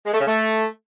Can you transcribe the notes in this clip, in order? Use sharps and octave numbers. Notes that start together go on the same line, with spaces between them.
G#3
A3
C#3
A3